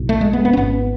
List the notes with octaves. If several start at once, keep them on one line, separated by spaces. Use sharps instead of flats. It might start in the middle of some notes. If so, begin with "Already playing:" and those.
Already playing: B1 A2
A3
G#3
B3
B3
C#4
G#1 G#2 B3